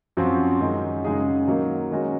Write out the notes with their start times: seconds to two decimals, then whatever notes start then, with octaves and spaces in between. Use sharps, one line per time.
0.17 F#2 F3 C4 F#4
0.60 F#2 D#3 G#3
1.05 F#2 C#3 G#3 D#4 G#4
1.47 D#3 F#3 A#3 D#4
1.91 D#3 G#3 C#4 F#4